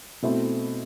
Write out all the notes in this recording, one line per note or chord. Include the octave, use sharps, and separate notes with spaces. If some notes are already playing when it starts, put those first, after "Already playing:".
B2 A3 C4 E4 A4